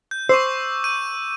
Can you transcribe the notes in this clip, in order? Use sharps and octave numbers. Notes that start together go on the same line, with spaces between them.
G6
C5 C#6 D6 E6
G6 D#7